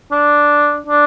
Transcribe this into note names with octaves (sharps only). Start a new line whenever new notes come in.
D4
D4